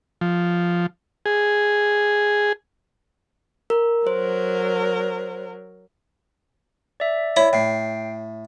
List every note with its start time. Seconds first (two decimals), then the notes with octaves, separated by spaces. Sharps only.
0.21 F3
1.26 G#4
3.70 A#4
4.07 F#3 A#4 C5
7.00 D5 E5
7.36 E4 C#5 B5
7.53 A2 G5 C7